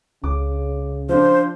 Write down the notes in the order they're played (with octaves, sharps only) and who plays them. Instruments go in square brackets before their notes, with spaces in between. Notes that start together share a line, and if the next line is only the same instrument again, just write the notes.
[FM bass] C#2 [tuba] C#3 [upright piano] D6
[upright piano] F3 D4 [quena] C5